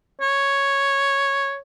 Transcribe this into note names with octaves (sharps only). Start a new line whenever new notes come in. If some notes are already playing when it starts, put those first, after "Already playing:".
C#5